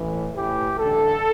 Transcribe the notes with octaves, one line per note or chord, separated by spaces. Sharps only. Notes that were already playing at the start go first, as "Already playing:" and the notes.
Already playing: A1 A2 E3
A1 A2 E3 G4
A1 G2 D3 A4